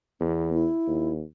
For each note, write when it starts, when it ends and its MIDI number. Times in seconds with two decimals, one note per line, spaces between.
0.21 0.67 40
0.21 0.51 59
0.53 1.12 64
0.87 1.23 39